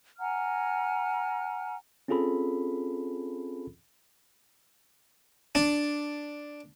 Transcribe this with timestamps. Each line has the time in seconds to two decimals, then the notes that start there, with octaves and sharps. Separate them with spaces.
0.19 F#5 G#5 A#5 F6
2.08 C4 C#4 F4 G#4 A4 B5
5.55 D4